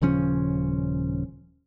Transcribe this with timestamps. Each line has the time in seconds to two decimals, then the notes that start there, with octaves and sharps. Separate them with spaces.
0.02 D#1 C#3 F3 C#4